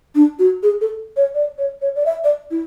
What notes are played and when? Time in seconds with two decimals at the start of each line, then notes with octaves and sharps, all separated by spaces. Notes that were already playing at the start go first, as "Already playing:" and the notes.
0.15 D4
0.39 F#4
0.63 G#4
0.81 A4
1.17 C#5
1.35 D5
1.58 C#5
1.82 C#5
1.96 D5
2.06 E5
2.24 D5
2.51 E4